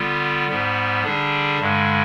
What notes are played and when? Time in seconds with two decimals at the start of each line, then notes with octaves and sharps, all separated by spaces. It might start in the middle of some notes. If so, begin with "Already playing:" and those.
Already playing: D3 G3 B3 F4
0.48 G#2 G3 B3
1.04 D3 G3 D4 G#4
1.59 G2 D3 G#3